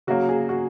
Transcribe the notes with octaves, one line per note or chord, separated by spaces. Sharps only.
C#3 F#3 A#3 F#4
G#4
F#4